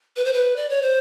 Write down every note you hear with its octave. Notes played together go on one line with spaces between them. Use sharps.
B4
C5
B4
D5
C#5
C5